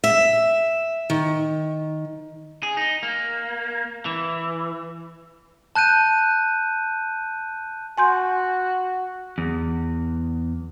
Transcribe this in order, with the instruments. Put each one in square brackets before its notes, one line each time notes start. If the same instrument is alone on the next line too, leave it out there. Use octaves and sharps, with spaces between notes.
[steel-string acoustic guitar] E5
D#3
[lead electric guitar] G#4
D#4
A#3
E3
[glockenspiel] A5 F#6 G6 D#7
[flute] F#4 [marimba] G#5 C6 G6
[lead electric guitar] E2